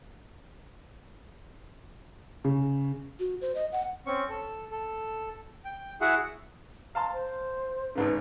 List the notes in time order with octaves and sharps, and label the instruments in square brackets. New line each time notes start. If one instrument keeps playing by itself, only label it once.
[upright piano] C#3
[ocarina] F#4
C5
D#5
F#5
[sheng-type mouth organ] C4 C#4 C#6
A4
A4
G5
E4 F#4 G#4 F#5
[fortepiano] F5 A5 C6 [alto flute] A#5
[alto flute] C5
[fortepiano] G#1 G#2 C#3 [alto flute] B4